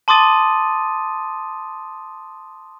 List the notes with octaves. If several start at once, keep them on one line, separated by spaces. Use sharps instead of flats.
A5 C6 D6 D#6 A6 D#7